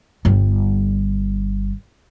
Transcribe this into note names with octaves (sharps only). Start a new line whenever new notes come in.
G1 G3